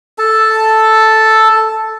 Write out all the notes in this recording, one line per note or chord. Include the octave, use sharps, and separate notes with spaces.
A4 A5